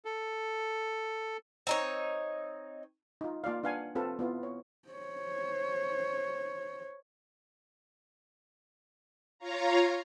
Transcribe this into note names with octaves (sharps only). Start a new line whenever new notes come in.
A4
C4 D#4 C#5
D#4 F4
A#3 F4 D5 F5
D4 B4 F5 F#5 G#5
C4 F4 A4 B4
B3 E4 F4
C#5
C5 C#5
F4 C#5 F5 A#5